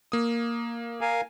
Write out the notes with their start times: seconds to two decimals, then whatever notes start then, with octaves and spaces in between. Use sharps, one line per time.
0.12 A#3 D#6
1.01 A#4 F5 G#5